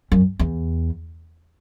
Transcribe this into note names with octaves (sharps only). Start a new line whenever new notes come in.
F#2
E2